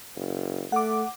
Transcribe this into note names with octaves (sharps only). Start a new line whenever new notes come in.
F#1
A3 F#5 D6